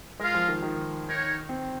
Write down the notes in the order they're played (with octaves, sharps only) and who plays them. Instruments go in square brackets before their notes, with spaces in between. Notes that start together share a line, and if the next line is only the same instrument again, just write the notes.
[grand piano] G#3 [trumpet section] F4 A#4 F5
[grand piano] F3
D#3
D#3
[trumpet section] D#4 A#4 C#5
[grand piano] C4